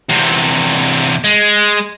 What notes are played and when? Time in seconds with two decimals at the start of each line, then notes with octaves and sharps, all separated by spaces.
0.10 E2 C3
1.24 G#3